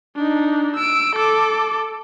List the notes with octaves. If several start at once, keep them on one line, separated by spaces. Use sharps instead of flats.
D4 D#4
E6 D7
A4 D6